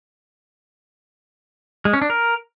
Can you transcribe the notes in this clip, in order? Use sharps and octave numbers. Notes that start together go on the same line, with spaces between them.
G#3
C#4
D4
A#4